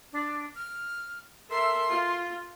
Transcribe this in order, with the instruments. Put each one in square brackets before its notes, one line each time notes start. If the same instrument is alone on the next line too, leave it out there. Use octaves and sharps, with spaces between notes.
[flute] D4
F6
[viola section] A4 A#4 E5 [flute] C6
[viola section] F4